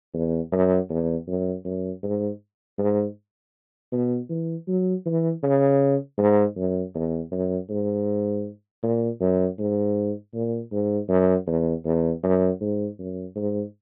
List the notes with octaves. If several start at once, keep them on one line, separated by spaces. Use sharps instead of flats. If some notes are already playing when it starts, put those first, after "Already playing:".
E2
F#2
E2
F#2
F#2
G#2
G#2
B2
E3
F#3
E3
C#3
G#2
F#2
E2
F#2
G#2
A#2
F#2
G#2
A#2
G#2
F#2
E2
E2
F#2
G#2
F#2
G#2